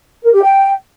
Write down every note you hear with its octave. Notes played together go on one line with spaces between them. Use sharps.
A#4
G4
G5